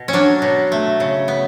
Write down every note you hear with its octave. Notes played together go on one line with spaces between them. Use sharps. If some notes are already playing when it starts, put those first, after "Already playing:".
Already playing: B2
C#4
F#3 D4
B2
A3
C#3
B3